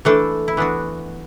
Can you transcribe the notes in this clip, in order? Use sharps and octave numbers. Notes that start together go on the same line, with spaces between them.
E3 A3 D4 A4
E4
E3 B3 D4 F#4